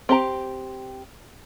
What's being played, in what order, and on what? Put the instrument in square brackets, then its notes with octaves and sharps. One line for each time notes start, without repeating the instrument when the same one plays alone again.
[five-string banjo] C4 G4 A#5